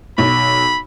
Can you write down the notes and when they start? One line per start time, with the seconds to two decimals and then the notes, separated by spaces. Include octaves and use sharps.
0.18 B1 B5